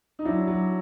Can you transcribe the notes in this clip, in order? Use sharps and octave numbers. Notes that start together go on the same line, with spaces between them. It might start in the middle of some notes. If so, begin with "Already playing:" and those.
D#4
F#3 D4 E4
F#3